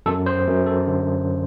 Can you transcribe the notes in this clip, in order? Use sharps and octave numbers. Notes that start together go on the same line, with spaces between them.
F#2 A4
C5
F#2
A4
D3